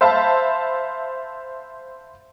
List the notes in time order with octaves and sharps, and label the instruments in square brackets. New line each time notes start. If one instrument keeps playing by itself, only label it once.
[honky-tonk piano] C5 E5 F5 A5 B5